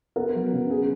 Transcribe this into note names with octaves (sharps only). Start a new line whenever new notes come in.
B3 A#4
F#3
C#3
C#4 G#4